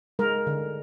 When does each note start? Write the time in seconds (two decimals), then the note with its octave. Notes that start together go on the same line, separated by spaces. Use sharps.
0.19 G#3 A#4
0.47 D3